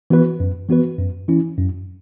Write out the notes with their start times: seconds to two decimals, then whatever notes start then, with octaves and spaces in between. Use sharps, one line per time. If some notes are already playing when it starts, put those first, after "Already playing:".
0.10 E3 B3 F#4 B4
0.40 F#2
0.69 E3 B3 F#4 B4
0.98 F#2
1.28 E3 C#4 E4
1.58 F#2